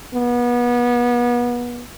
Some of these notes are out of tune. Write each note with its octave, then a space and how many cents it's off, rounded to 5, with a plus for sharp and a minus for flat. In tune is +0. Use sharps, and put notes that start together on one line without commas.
B3 -30